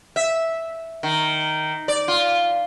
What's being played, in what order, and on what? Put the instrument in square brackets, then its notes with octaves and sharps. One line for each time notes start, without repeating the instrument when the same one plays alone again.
[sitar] E5
D#3
D5
F4